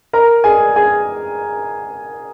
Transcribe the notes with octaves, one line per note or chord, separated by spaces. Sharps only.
A#4 A#5
G#4 G#5
G#4 G#5